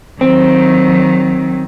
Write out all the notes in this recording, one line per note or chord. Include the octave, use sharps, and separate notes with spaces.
D#3 F#3 C4